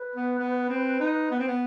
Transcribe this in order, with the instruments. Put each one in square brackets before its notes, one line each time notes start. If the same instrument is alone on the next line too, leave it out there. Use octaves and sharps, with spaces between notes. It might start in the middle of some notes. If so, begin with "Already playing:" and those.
Already playing: [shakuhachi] B4
[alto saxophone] B3
B3
C4
D#4
B3
C4
B3